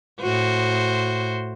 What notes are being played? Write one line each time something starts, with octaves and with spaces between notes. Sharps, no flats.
A2 F#4 C5